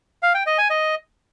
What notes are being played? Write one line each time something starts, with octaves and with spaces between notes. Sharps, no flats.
F5
G5
D#5
G#5
D#5